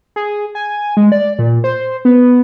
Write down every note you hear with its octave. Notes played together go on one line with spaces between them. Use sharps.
G#4
G#5
G#3
D5
A#2
C5
B3